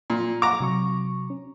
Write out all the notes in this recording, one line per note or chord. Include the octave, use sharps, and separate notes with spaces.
A#2
F5 A#5 D6
C3 F#3 C#6
C#4